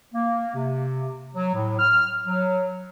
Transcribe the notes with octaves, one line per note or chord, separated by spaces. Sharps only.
A#3
C3
F#3
A2
F6
F#3